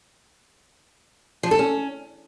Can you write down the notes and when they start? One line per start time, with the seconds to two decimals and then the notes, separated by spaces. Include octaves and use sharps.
1.43 F3
1.51 A4
1.59 C#4